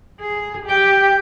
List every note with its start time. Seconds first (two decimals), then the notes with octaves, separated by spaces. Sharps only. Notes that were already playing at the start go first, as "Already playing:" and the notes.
0.21 G#4
0.66 G4 G5